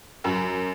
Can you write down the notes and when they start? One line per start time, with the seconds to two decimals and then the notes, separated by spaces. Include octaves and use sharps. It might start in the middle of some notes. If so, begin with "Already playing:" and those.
0.24 F#2